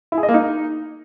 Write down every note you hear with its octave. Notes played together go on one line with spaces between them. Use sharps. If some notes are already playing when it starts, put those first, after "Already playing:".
E4
G#4
D#5
A#3
D#4